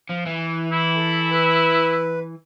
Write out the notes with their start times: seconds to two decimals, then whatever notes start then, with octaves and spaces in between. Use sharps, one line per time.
0.09 F3
0.26 E3
0.71 E4
0.96 A4
1.31 B4